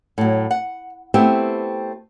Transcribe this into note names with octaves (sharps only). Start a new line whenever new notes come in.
A2 F#3
F#5
A3 B3 C4 E4 G4